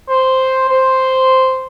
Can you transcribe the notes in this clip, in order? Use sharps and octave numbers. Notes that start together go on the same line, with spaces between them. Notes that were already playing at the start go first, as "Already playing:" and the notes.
C5
C5